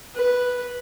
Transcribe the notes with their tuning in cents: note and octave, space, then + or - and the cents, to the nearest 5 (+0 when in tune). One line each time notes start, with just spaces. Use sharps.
B4 -5